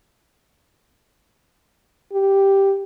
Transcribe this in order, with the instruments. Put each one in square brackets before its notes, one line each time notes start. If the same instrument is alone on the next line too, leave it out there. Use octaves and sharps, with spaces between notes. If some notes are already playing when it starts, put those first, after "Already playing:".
[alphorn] G4